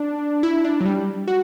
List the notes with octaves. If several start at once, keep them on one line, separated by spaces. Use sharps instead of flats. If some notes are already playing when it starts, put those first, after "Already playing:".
Already playing: D4
E4
D4
F#3
G3
F#4